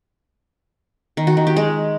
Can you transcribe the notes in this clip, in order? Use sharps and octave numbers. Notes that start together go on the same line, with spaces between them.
D#3
F#4
D#3
G4
G#3